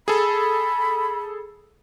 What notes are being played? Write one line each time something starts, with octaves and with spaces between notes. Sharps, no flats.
G#4 A4 B5